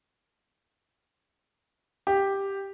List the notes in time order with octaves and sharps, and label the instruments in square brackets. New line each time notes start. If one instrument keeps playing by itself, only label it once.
[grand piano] G4